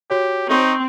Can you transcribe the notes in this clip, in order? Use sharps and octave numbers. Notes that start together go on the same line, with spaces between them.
F#4 G4 C#5
C4 D#4 C#6